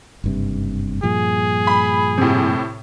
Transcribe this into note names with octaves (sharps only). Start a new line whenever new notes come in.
F#1 G2 C3
G2 A#2 F3 G#4
B5
A2 C3